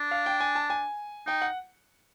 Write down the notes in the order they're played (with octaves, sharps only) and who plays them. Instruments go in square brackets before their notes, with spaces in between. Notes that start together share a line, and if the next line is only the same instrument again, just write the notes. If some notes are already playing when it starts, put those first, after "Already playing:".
Already playing: [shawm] D4
[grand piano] F5
G5
G#5
A5
G#5
[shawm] D#4 [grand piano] G5
[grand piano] F#5